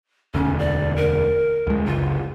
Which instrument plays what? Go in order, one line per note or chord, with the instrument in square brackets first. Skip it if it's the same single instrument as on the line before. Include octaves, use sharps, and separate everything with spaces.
[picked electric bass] E1 D2 [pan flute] C#4
[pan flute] D5
A#4
[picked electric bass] D2 G#3
[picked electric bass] F#1 C#2 [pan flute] F4